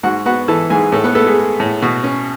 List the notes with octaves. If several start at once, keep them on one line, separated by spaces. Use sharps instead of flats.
G#2 F#4 F#5
B3 F#4 F#5
E3 A4 A5
G#2 G#4 G#5
A2 A4
B3 B4
A3 B3 A4
G#3 G#4
G#3
A2
B2 F#4
C#4